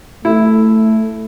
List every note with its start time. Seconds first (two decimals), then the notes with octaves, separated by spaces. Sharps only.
0.25 A3 E4